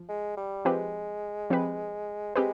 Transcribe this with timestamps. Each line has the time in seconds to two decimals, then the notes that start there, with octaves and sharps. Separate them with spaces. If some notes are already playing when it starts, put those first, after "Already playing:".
Already playing: F3
0.08 G#3
0.36 G3
0.65 F3 G#3 C4 G4 B4
1.50 F3 C4 G4 B4
2.35 G#3 C4 G4 B4